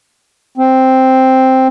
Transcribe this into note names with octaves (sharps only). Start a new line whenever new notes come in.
C4